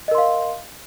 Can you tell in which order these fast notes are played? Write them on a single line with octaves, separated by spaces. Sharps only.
D#5 A#4 C6 F5